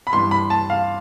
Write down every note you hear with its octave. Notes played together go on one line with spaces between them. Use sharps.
B5
G2 E3 G3 C6
B5
A5
F5